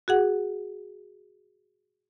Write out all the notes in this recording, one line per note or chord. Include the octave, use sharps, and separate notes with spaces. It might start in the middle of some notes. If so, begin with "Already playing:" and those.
F#4 G#4 F#5